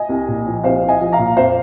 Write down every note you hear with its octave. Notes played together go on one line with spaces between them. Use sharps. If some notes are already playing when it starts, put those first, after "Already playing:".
Already playing: D#5 G#5
C2
A#2
F3
C2 C5 F5
C2
D#5 G#5
F3
F5 A#5
A#2
F2 C5 F5